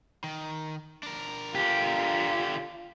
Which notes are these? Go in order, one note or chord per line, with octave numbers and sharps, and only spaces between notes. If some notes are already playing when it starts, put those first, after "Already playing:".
D#3
D4 A#4
D3 F4 G4